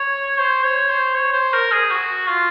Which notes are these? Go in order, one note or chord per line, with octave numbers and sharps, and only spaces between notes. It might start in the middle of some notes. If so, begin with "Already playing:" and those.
Already playing: C#5
C5
C#5
C5
C#5
C5
A#4
G#4
F#4
F4